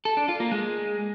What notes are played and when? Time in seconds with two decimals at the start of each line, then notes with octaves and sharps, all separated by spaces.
0.05 A4
0.17 D4
0.28 F4
0.40 A#3
0.52 G#3